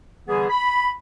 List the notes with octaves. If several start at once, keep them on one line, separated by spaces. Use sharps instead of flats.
D3 E3 G3 B3 G#4
B5